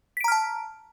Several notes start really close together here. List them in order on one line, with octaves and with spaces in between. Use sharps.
B6 D7 A#5 F6 A5